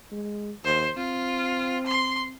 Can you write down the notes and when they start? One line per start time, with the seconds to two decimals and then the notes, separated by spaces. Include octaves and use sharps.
0.11 G#3
0.64 D#2 C5
0.97 C4 F4
1.86 C6